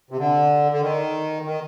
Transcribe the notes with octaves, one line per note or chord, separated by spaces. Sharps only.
C3
D3
D3
D#3
D#3